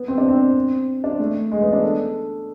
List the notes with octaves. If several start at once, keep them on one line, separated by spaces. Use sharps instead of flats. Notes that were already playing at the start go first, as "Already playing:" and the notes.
Already playing: B3
C4
D4
C4
D4
A3
G#3
B3
D4
A4